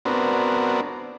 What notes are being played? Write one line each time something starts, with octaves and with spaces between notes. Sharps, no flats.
B3 C4 D4 F#4 A#4